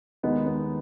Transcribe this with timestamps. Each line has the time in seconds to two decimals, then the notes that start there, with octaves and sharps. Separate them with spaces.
0.23 D#2 D#3 G#3 B3 D#4
0.46 B3